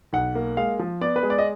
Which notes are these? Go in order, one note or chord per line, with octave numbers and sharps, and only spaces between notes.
B1 F#5
A#3
G#3 F5
F3
B3 D5
B4
G#3
D5
D#5